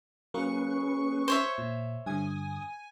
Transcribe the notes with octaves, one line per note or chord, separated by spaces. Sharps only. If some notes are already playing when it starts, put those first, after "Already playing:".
F#3 A#3 C#4 G#4 A#4 B4 C#6
C5 C#5 E5
A#2
G2 D3 G#5 D#6